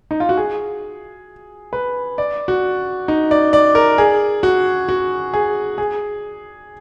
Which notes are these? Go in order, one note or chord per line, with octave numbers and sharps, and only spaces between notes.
D#4
F4
F#4
G#4
B4
D5
F#4
D#4
D5
D5
A#4
G#4
F#4
F#4
G#4
G#4